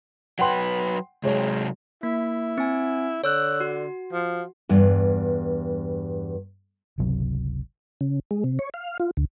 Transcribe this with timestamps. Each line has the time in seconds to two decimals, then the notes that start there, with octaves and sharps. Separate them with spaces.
0.39 F#3 B4 F#5 G5 C6
1.24 C3 F#3 G#3 C#5
2.03 A#3 E4
2.58 C4 G#5
3.24 D3 C#5 E6 F#6
3.61 F#4
4.13 F3
4.69 E2 G2
6.98 G1 C#2 C3 F#3
8.01 C#3
8.31 G#3
8.44 C3
8.59 C#5
8.74 F5
9.00 F4
9.17 D2